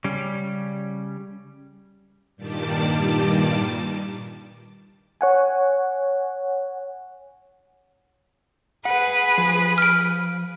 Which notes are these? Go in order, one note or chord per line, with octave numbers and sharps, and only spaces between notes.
C#3 G3 C#4
G2 A#2 D#3 G3 A5 D6
C#5 F#5 G#5
G#4 B4 F#5
F3
F6 D7